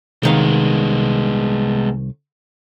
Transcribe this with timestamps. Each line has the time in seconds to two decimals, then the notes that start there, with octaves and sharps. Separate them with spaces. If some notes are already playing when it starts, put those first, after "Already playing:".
0.23 C2 D#3 G#3 B3 F5